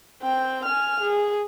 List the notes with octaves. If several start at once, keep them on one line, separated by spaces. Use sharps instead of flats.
C4 G5
G#5 F6
G#4